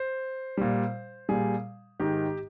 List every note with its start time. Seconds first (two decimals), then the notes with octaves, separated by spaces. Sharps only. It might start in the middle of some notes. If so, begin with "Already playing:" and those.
Already playing: C5
0.57 A#2 G3
1.29 A#2 G3 G#4
2.00 G#2 D#3 G#3 G4